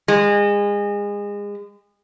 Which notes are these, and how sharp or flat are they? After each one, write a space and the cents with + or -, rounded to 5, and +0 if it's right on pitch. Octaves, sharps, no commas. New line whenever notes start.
G#3 -30